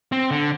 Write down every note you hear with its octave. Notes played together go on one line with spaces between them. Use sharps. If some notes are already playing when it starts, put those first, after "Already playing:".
C4
D3